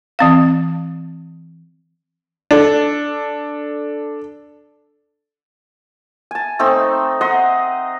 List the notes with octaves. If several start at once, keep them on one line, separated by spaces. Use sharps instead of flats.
E3 C4 F5
D4 A4
G#5 A5
A3 C4 D#4 E6
D#5 F#5 A#5 C6